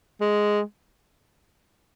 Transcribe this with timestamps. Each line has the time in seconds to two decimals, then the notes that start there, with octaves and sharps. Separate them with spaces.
0.21 G#3